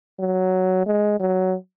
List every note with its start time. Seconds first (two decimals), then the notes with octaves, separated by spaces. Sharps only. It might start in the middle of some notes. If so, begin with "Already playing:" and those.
0.20 F#3
0.86 G#3
1.20 F#3